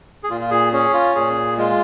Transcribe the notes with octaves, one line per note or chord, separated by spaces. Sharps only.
G#4
A#2 F4
F4
G#4
C#4 G#4
F4
A#2 G#4
G#3 F4